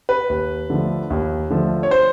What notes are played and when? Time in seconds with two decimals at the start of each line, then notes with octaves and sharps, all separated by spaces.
0.09 B4
0.30 D#2
0.70 D3 F3 A3
1.10 D#2
1.50 D3 F3 A3
1.83 C#5
1.91 C5